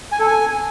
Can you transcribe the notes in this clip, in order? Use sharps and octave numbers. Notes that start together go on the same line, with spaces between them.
G#5
A4
G#5